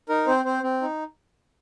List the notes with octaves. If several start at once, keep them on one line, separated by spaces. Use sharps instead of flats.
D#4 A#4
C4 C5
C4 C5
C4
D#4